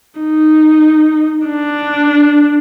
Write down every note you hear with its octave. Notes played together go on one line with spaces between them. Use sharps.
D#4
D4